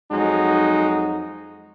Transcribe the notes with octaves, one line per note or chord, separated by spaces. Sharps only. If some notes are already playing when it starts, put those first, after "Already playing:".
F2 F#3 G#3 D#4 F#4